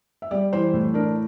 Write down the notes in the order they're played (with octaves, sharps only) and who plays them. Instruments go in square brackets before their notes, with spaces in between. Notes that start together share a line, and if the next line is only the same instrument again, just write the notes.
[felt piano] E5
G3 D5
E3 C5
A2
D4 A#4